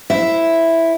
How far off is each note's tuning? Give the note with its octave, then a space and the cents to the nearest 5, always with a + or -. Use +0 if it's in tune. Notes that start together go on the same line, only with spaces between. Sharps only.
E4 +0 C5 -10 E5 +0